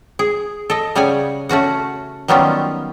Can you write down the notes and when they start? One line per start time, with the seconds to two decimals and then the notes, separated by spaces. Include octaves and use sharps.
0.19 G#4
0.70 A4 D#5
0.95 C#3 G3 C#5 F#5 G#5
1.49 A3 C#4 F#4 F#5
2.28 D#3 F#3 G3 B3 C#4 F4